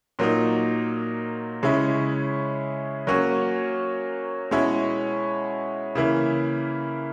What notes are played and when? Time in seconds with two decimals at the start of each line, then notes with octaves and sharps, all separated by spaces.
0.19 A#2 F#3 A#3 D#4
1.63 C#3 G#3 C#4 E4
3.07 F#3 A#3 C#4 F#4
4.51 B2 G#3 C#4 E4
5.95 C#3 E3 A#3 E4